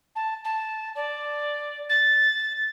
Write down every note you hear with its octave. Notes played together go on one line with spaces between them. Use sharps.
A5
A5
D5
A6